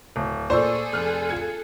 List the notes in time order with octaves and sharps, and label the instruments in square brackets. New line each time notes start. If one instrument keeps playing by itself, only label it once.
[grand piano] D1
[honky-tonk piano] A#2 C#6 E6 [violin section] G#4 A4 [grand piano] C5 [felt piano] D5
[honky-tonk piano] F1 F6 F#6
F4 G#6 C#7